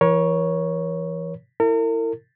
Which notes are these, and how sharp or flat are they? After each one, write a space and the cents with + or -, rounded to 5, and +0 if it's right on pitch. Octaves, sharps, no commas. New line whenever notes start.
E3 +30 A#4 +35 C#5 +0
E4 +0 A#4 -45